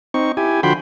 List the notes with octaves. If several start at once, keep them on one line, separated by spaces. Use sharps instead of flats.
C4 D#4 C#6
E4 G4 G#5
D3 F3 F#4 G5 B5 C6